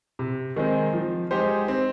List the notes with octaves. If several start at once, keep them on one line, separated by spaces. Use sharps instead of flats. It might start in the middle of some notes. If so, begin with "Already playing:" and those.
C3
D#3 G#3 C4
F3
G#3 D#4 G4 C5
C4